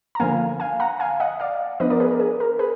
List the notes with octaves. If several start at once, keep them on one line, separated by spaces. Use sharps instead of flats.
A#5
D3 F3 A#3 F5 G#5
F5 G#5
F#5 A#5
F5 G#5
D#5 F#5
D5 F5
F3 B3 D4 B4 D#5
A#4 D5
G#4 B4
A#4
G#4
A#4
G#4 B4